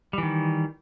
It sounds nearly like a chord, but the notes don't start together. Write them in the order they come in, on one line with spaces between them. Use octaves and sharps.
G3 E3 D#3